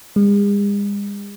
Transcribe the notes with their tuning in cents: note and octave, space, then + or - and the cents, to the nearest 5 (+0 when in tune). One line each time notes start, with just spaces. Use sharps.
G#3 -45